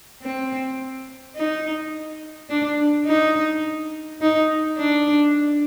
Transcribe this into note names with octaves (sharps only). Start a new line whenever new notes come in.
C4
D#4
D4
D#4
D#4
D4